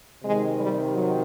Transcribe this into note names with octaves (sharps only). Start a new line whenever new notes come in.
C3 D#3 G#3
G3
F#3